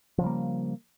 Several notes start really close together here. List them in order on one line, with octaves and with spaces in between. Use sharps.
F3 C#3 G3 A#3